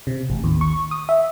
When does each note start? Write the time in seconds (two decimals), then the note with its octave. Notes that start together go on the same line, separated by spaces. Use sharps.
0.07 C3
0.30 A1
0.44 D#2
0.61 C#6
0.91 D#6
1.09 E5